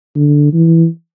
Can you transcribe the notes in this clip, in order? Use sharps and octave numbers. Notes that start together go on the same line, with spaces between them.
D3
E3